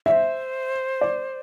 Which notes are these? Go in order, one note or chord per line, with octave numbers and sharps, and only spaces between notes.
D5 E5
C5
D5